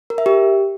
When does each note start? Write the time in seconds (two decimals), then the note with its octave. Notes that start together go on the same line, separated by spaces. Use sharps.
0.10 A#4
0.18 E5
0.26 G4